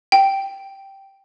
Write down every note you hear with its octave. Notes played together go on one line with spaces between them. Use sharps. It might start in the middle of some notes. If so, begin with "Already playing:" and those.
G5